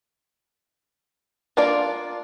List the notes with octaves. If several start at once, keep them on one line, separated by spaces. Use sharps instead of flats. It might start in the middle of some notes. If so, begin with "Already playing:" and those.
A#3 D4 F4 D5